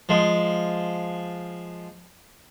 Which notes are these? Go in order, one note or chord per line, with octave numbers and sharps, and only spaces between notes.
F3 G#3